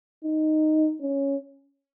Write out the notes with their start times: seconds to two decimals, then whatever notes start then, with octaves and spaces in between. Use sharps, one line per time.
0.25 D#4
1.02 C#4